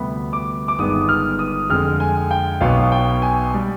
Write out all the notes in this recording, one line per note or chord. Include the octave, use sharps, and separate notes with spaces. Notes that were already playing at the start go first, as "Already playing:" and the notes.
Already playing: D2 C3 G3 B3 B5
D6
D6
G1 G2 D#3 G#3 B3 D#6
F6
D#6
F2 D3 G#3 F6
G#5
G5
B1 B2 B3 F5
G5
G#5
G3